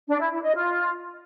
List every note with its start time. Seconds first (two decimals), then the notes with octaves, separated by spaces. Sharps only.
0.09 D4
0.20 E4
0.32 E4
0.43 D#5
0.54 F4